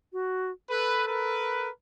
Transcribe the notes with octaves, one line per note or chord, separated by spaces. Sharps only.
F#4
A4 B4
A#4 B4